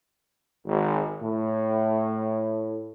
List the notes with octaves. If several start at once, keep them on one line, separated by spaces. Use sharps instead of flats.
G#1
A2